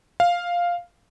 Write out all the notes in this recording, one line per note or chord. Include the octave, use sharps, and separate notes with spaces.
F5